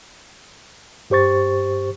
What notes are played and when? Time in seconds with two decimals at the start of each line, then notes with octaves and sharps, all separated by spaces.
1.10 G2 G4 C5 C#6 A6